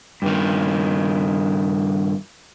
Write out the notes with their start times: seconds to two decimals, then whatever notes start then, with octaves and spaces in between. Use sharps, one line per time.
0.22 G2 D#3